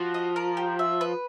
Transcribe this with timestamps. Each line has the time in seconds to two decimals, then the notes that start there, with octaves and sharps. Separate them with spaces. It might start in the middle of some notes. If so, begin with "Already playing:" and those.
Already playing: F3 F#4
0.14 D#5
0.36 A#4
0.57 G4
0.79 E5
1.01 B4